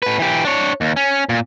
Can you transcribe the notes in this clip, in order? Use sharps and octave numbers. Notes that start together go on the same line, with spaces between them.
A2 B4
E3 G4
D4 C#5
D#2
C#4
A#2